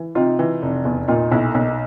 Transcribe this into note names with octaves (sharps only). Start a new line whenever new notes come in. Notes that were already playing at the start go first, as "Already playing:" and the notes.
Already playing: E3
C3 D#4 F4
E3
F1
E2
A#2 D#4 F4
B1 E4
B1 D#4